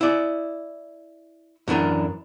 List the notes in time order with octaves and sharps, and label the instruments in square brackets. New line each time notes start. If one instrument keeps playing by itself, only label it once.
[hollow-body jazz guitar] E4 D5
F#2 E3 D4 A#4